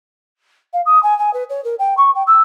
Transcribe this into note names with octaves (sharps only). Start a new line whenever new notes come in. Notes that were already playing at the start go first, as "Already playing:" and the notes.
F5
D#6
G#5
G#5
B4
C#5
A#4
G5
C#6
G5
E6